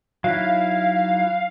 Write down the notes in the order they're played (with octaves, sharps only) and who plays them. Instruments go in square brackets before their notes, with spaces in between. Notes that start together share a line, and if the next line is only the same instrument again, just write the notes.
[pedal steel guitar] F#3 D#4 E4 [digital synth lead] F5